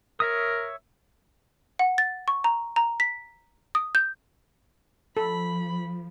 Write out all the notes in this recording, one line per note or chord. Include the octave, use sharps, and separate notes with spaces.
A#4 C#5 E5 D#6
F#5
A6
C#6
A#5
A#5
B6
D#6
G6
F3 A4 B5